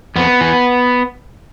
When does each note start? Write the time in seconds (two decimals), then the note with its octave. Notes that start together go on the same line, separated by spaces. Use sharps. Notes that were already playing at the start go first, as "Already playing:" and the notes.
0.16 F2 B3
0.41 E3